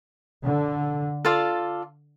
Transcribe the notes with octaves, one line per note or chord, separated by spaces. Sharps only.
D3
F4 A4 D5 F5